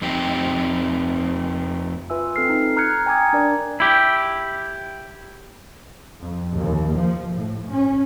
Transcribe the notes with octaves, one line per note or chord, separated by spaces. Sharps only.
F2 C4 D#4 G4
F4 B4 E5 G#5 E6
C4 A4 F6 C7
D#4
A#5 F6 F#6 G#6 C#7
G5 G#5 A#5 D6 D#6 G#6
D4 A#4 D5
E4 G4
F2
D#2
F3
A2
C#4